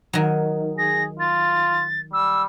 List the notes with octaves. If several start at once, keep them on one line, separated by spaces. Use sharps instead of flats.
D#3 F#3
G#4 A#6
F4 A6
G3 E6